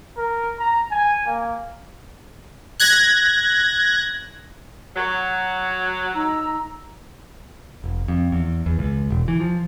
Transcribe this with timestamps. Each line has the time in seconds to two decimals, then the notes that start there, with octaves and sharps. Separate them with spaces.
0.17 A#4
0.59 A#5
0.91 G#5
1.26 A#3
2.80 F#6 G#6 A#6
4.95 F#3
6.12 D#4 A#5 E6
7.84 F1
8.08 F2
8.32 E2
8.66 E2
8.79 C#2
9.10 E1
9.28 E3
9.40 F3